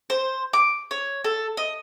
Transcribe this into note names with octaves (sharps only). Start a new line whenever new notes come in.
C5
D6
C#5
A4
D#5